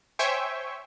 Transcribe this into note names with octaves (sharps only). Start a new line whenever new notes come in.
C5 C#5 E5 G5 G#5 C#6